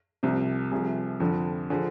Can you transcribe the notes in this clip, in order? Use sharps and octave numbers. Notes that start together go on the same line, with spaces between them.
C2 C3 F3
C2 C3 F3 G#4
F2 D3 F3
D3 F3 G#4